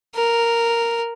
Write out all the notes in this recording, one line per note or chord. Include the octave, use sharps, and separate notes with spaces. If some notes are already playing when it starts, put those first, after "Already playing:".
A#4